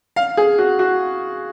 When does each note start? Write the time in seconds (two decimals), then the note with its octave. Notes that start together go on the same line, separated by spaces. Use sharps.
0.16 F5
0.37 G#4
0.58 F#4
0.79 F#4